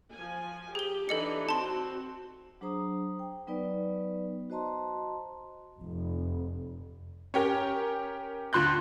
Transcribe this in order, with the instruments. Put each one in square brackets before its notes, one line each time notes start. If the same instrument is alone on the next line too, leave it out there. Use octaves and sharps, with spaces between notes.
[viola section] F3 G#5
[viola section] G4 [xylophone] G#4 G7
[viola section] E3 D4 D#4 [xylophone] A4 D#5 C#7
[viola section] C4 F#4 [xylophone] A5 C6
[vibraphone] F#3 D4 G#4 C5 A#5 D#6
G5
F#3 B3 D#4 B4 D5
F#4 C5 D#5 A5 A#5 C6
[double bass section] F1
[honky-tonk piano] C#4 G4 A#4
D2 F4 C6 F#6 G6